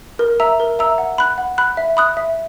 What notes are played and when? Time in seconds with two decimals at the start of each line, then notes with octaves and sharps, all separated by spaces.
0.19 A#4
0.40 E5 A#5 E6
0.60 A#4
0.79 E5 A#5 E6
0.98 F#5
1.18 B5 F#6
1.38 F#5
1.58 B5 F#6
1.77 E5
1.97 B5 D#6 F#6
2.17 E5